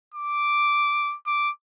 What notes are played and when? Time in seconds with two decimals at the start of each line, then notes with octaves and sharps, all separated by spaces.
0.14 D6
1.27 D6